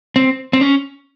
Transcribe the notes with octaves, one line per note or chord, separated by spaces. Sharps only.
C4
C4
C#4